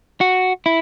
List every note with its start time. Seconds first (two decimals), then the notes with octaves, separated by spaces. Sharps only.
0.21 F#4
0.66 E4